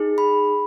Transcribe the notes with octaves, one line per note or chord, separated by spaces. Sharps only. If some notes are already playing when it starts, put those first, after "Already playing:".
Already playing: D#4 G#4
B5